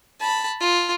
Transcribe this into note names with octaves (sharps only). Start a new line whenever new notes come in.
A5 B5
F4